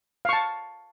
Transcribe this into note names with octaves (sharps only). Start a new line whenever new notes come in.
F5 A5 C#6